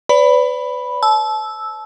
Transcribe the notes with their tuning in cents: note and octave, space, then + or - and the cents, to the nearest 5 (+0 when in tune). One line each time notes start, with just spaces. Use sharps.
B4 +30 D5 -30 B5 +0
A5 -30 E6 -5